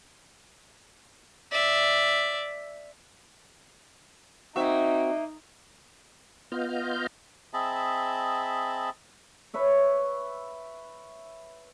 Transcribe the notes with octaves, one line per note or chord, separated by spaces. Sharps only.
D5 E5
A#3 C4 D#4 F#4 E5
B3 F4 D#5 F6 G6
C4 G#4 D#5 E5 A5 B5
B4 C#5 E5